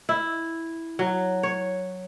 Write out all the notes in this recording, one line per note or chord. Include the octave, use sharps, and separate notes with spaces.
E4
F#3
C#5